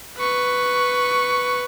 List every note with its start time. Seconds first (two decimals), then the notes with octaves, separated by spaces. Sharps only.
0.17 B4 C#6